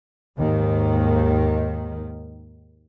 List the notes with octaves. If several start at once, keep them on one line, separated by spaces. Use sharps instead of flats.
D#2 G#2 D#3